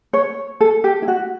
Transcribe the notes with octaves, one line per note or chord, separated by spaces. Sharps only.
C#5
A4
G4
E4
F#4